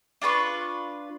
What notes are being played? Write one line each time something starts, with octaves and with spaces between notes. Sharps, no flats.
D4 F4 B4 C#6